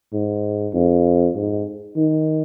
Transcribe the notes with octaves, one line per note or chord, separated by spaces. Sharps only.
G#2
F2
G#2
D#3